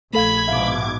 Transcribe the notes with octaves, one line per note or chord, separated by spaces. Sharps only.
A#1 A3 A4 F5 B5 G#6
G#2 B2 E5 F5 D6